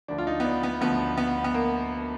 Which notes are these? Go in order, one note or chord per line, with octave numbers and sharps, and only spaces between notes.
D2 D3 F3 D4
F4
D#4
B3
D4
B3
D2 D3 F3 B3
B3
B3
A#3